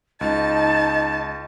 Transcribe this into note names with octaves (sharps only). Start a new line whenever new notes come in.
C#2 D#4 D#5 A5